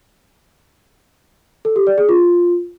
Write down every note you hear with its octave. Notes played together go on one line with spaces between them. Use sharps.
A4
G4
D5
G#4
F4